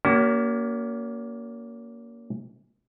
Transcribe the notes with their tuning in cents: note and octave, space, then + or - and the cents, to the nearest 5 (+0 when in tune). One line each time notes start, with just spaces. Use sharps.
A#3 +5 C#4 +35 F#4 +40